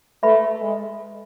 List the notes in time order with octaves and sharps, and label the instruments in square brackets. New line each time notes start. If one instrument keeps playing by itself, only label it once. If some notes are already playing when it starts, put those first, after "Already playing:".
[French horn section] A3 [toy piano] B4 E5 B5
[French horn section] G#3